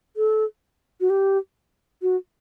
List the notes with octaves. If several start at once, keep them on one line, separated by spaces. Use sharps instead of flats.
A4
F#4
G4
F#4